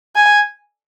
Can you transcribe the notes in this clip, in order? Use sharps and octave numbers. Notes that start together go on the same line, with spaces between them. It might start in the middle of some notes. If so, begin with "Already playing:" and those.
G#5